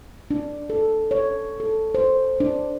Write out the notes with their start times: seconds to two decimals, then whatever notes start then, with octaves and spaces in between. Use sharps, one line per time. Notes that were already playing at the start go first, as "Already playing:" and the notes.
0.31 D4
0.70 A4
1.11 C#5
1.60 A4
1.95 C5
2.40 D4